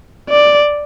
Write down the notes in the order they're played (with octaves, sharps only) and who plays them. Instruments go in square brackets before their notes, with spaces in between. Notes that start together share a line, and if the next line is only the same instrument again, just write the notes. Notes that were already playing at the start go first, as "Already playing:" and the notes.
[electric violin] D5